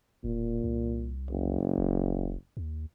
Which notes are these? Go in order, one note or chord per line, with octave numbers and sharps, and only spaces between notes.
E1 A#2
C2
F#1
D#1
D#2